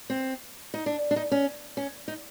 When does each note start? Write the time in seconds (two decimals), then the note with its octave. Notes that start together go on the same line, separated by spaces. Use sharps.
0.10 C4
0.74 D#4
0.86 D4
1.11 D4
1.16 D#4
1.32 C#4
1.77 C#4
2.08 D#4